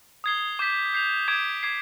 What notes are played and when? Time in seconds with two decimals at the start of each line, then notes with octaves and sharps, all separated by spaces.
0.24 D#6 G#6 C7 G7
0.59 D6 G6 B6
0.94 G6 C7 F7
1.28 D6 G#6 D7
1.63 D6 G#6 C7